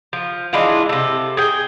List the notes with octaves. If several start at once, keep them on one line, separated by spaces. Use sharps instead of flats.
F3
E3 G#3 D4 F4
C3 A4
G#4 G5